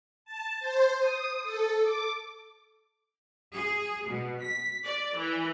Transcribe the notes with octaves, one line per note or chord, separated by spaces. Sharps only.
A5
C5
D#6
A4
D6
G#4
B2
B6
D5
E3